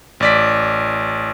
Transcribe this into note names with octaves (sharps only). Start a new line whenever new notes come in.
A1 D5 B6